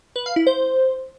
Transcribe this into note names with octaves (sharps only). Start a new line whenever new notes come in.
B4
F5
E4
C5